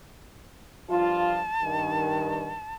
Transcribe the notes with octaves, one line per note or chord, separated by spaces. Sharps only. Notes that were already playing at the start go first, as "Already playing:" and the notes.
G2 F3 F4 A5
G2 D#3